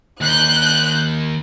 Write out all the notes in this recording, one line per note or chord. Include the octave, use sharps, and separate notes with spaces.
D#2 F#6 G6